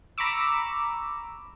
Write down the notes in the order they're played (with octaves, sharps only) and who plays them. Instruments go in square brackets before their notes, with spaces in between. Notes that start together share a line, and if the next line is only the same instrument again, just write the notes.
[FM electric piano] A#5 B5 C#6 D6 E6